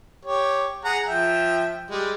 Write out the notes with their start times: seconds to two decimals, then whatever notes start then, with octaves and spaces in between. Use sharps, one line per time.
0.25 G4 C#5
0.84 G#4 F#5 A#5
1.08 F3 E5 G5
1.90 G3 G#3